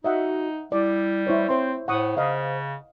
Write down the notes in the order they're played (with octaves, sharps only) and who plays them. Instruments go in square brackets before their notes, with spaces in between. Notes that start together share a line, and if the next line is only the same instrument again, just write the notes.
[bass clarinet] D#4 [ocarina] F#4 [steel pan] D#5 E5 F#5
[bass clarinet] G3 [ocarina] E4 [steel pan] D5
[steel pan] E4 C5 C#5
[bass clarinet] C4 [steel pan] C5 C6 [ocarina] C#5
[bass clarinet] A2 [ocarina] C5 [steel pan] F#5 C#6 D#6
[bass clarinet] C#3 [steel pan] D#5 F5